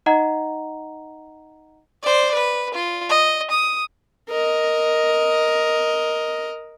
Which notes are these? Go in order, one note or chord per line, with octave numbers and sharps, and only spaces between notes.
D#4 D#5 F#5 A#5
C5 D5
B4
F4
D#5
D#6
A#4 D#5